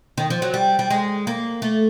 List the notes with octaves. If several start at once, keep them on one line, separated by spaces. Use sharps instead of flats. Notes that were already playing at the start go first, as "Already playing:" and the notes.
D#3
F3
F#3
G3
G3
G#3
A#3
A3